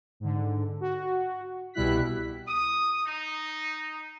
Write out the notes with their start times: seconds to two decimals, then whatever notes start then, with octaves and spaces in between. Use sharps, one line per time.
0.20 G#2 D3
0.80 F#4
1.74 C2 B2 G3 E4 F#6 B6
2.48 D#6
3.06 D#4